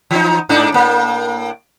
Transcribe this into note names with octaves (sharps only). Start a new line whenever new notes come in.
E3 D#4
G#2 D4 D#4
A2 A#3